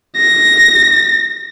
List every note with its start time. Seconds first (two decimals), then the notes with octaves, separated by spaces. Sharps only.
0.16 A#6